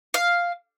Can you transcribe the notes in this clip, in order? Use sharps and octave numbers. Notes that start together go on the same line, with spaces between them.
F5